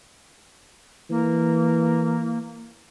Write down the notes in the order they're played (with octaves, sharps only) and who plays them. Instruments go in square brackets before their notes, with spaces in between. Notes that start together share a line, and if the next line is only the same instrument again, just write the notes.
[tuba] E3 [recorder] A#3